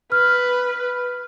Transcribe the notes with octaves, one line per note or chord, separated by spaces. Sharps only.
B4 F6